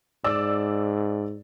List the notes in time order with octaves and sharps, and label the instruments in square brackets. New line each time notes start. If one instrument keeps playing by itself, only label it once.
[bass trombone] G#2 [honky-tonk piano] D5 E6